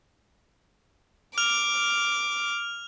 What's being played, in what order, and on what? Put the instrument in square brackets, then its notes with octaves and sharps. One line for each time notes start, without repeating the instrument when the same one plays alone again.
[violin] D6 [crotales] F6 F7